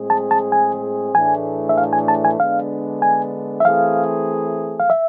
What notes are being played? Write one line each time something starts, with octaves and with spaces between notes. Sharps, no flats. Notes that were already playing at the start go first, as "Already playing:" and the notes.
Already playing: A2 G#3 C4 G#4
A5
A5
G#5
A2 E3 A3 D4 G#4 G#5
E5
F5
G#5
A5
G#5
D3 G#3 B3 D4 F5
G#5
E5
E3 A3 C4 G#4 F5
F5
E5